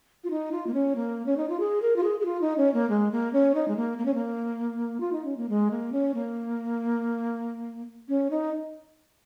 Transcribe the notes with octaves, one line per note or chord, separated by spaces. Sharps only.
F4
D#4
F4
A#3
C#4
A#3
C#4
D#4
F4
G#4
A#4
F4
G#4
G#4
F4
D#4
C#4
A#3
G#3
A#3
C#4
D#4
G#3
A#3
A#3
C#4
A#3
F4
D#4
C#4
A#3
G#3
A#3
C#4
A#3
C#4
D#4